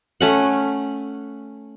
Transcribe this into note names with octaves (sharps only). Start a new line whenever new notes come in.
A3 C#4 F#5